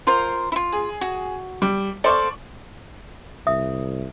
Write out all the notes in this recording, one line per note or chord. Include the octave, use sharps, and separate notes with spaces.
F4 A#4 C5
E4 F4
G#4
F#4
G3 D6
A4 C5 D5 F5 C#6
C2 E5 D#6